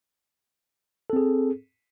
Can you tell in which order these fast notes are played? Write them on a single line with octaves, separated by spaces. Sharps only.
A4 C4 G#4